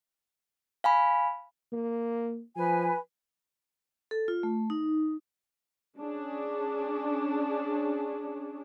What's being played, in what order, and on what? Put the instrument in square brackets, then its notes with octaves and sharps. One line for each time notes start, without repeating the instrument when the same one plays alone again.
[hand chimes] F5 G#5 B5
[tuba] A#3
[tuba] F3 [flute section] B4 G#5
[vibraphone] A4
F4
A3
D#4
[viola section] C#4 D4 G#4